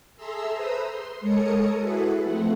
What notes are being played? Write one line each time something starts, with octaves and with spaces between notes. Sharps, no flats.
G#4 A4 E5 A#5 C6 E6
B4 C5 A#5 D#6 E6
C6
G#3 A4 A#4 C#5 D#6 C#7
E4 F#4 G#4 A4 B4
F3 A3 C4 F#5